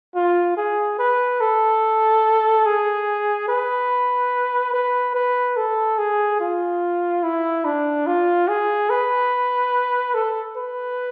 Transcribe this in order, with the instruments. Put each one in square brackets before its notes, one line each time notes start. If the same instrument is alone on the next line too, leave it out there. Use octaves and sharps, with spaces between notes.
[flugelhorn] F4
G#4
B4
A4
G#4
B4
B4
B4
A4
G#4
F4
E4
D4
F4
G#4
B4
A4
B4